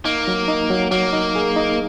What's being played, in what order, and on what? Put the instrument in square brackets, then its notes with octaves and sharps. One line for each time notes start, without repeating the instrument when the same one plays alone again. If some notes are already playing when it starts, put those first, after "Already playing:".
[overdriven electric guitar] A#3 [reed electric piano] D#4
[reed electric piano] F#3
D#4
F#3
[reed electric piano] F#3 [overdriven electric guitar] A#3
[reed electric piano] D#4
G#4
D#4